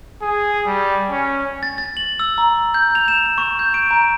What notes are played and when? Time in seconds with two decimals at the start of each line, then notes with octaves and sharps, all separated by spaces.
0.22 G#4
0.67 G3
1.11 C#4
1.63 A6
1.78 A6
1.97 F#7
2.20 E6
2.38 A#5
2.74 G6
2.95 F7
3.08 E7
3.38 C#6
3.59 G6
3.74 D7
3.91 A#5